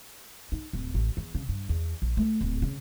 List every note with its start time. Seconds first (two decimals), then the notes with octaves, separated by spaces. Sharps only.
0.52 D#4
0.73 D1
0.94 A1
1.17 E2
1.35 C#3
1.49 G2
1.69 E2
2.02 A#1
2.17 A3
2.41 D1
2.62 C#3